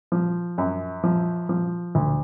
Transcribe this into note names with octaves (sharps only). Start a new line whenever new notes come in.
F3
F#2
F3
F3
D2